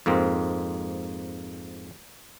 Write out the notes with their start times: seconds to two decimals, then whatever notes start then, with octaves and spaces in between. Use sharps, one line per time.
0.06 F2 G#2 A#3 C4